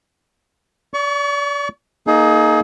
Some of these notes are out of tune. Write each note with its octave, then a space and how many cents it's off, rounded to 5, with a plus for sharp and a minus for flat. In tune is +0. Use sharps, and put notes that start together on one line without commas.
D5 -35 C#6 +30
A#3 +0 D#4 +5 G#4 +35